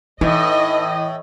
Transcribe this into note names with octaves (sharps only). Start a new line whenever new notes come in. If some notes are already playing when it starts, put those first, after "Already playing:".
A2 E3 D#4 D#5